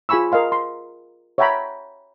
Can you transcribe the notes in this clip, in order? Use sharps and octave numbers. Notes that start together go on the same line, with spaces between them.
F4 G#4 G#5 B5 C#6 E6
A#4 D#5 F5 C6
C6
C#5 E5 F#5 G5 A#5 B5